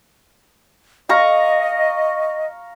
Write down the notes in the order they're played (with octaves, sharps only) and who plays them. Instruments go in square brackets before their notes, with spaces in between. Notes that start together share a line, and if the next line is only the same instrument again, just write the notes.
[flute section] D#5 [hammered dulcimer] F5 A#5 C#6